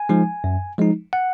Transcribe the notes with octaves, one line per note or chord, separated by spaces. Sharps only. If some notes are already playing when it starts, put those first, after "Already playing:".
Already playing: G#5
F3 G#3 D#4
F#2
F3 G#3 D#4
F#5